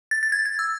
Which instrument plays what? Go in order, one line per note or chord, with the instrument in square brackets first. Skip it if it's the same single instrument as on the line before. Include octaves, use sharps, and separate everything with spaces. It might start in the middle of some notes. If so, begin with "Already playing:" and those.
[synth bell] A6
A6
G#6
G#6
E6